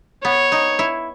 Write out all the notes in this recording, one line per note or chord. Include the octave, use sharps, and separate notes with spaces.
B3 C#5
D#4
E4